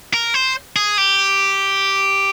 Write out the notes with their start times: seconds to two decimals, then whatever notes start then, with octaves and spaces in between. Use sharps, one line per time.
0.14 A#4
0.34 C5
0.76 G#4
0.98 G4